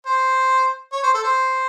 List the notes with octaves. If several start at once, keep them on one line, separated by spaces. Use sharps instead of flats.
C5
C#5
C5
A4
C5